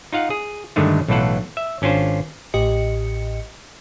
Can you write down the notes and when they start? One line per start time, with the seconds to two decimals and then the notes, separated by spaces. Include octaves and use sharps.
0.13 D#4 F4 F5 F#5
0.30 G#4
0.76 G2 D3 D#3 G#3 A3
1.08 B1 A2 E3 F4 A4 F#5
1.57 E5
1.82 G#1 C#4 D4 F4 C5
2.54 A1 A2 G4 D#5 C#7